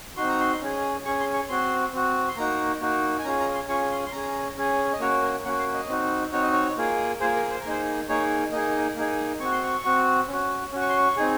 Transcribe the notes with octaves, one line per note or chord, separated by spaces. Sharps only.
C4 D#4 F#4 C6
A#5
C6
C#4 G#4
C#4 G#4 C#6
C6
C#6
C4 F#4 C6
C4 F#4
C6
A#3 D#4 F#4 A#5
A#3 D#4 F#4
G#5
C#4 F4 G#4 A#5
A#5
C6
C#4 F4 G#4 C#6
C6
C6
C#4 G#4 A#5
C#4 G#4
D#5
A#3 C#4 F#4 C#5
A#4
A#3 C#4 F#4 F#5
F5
D#5
C4 D#4 F#4
C4 D#4 F#4 C#5
D#5
C#5
A#3 F4 G#4
A#3 F4 G#4 C5
A#4
C5
A#4
A#3 D#4 G#4 C5
A#3 D#4 G#4 C#5
A#3 D#4 G#4 D#5
A#3 D#4 G#4
C4 F#4 C#6
C6
C#6
C4 F#4
C#4 F#4
C#4 F#4
C#6
C6
C#6
C4 D#4 G#4